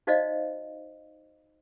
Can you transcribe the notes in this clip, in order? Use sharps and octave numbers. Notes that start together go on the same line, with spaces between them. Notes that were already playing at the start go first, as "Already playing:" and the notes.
D#4 F#4 C5 D5 D#5 F5